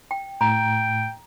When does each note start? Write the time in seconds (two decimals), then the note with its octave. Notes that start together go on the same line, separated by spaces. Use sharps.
0.11 G5
0.41 A2 G5 A#5